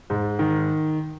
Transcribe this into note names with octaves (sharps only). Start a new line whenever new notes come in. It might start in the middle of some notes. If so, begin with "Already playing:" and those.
G#2
D#3